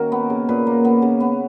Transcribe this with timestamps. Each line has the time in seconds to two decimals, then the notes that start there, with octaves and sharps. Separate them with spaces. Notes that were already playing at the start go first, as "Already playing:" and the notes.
Already playing: D#3 A#3 C#4 F#4 A#4
0.12 B3
0.30 C#3
0.49 A#2 B4
0.67 A#3
0.85 B3
1.02 C#3
1.20 B3